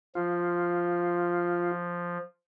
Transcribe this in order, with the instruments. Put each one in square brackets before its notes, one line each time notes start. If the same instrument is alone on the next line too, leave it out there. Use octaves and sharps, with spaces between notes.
[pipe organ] F3 [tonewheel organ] F4